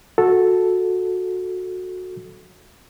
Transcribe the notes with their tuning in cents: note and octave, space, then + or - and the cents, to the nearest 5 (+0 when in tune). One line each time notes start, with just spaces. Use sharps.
F#4 -15 A4 +0